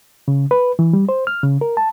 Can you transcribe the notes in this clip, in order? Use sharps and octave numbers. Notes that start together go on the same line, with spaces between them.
C#3
B4
E3
G3
C5
F6
C#3
A#4
A5